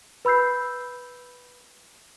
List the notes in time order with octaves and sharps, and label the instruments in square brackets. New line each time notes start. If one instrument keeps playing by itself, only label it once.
[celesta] B4 B5 E6 G6 C7